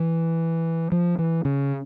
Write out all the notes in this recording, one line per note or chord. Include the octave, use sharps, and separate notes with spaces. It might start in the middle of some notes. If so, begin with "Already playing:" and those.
Already playing: E3
F3
E3
C#3